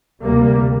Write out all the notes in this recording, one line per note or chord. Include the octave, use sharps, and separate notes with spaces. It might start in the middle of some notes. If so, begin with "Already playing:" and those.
D2 C3 G3 A#3